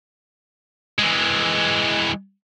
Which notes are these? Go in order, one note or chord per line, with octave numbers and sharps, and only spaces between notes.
E3 G#3